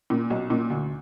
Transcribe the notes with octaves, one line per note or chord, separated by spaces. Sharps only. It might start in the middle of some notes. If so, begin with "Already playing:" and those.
A#2
B1
A#2
D2